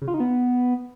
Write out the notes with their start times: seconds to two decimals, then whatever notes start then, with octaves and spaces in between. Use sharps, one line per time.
0.02 C#3
0.08 F4
0.14 D#4
0.20 B3